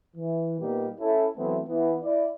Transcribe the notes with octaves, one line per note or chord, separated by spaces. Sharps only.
E3
A#2 G3 A#3 B3 D#4 G4
C#4 E4 A4
E3 F#3 A3 B3 C4 E4
E3 B3
E4 D5